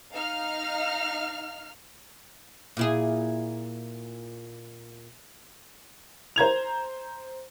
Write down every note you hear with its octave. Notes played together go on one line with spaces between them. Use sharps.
D#4 F5 F6
A#2 E4 G#4
C5 A#5 G#6 F7